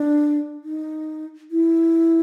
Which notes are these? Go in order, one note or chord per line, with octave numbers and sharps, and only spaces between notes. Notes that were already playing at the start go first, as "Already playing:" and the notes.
Already playing: D4
D#4
E4